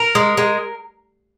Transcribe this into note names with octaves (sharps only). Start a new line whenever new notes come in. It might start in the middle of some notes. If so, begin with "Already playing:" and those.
Already playing: A#4
G#3
G#3